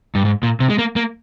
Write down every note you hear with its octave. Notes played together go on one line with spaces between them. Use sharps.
G2
G#2
A#2
C3
G#3
A#3
A#3